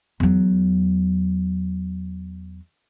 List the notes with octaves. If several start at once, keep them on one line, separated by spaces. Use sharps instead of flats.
E2 F#3